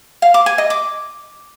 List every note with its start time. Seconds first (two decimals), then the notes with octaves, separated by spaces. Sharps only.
0.22 F5
0.34 D6
0.46 G#5
0.58 D#5
0.70 D6